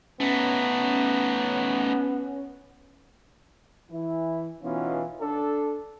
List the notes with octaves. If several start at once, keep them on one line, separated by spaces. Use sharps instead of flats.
A3 B3 C#4 D#4
E3 E4
B2 E3 B3 C#4 D#4 F4
D4 A4